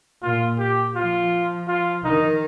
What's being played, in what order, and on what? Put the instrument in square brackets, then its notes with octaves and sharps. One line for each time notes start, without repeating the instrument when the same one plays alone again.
[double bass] A#2 [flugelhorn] F4
[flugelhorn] G4
[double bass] F3 [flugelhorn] F4
[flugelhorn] F4
[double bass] D#3 [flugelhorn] D#4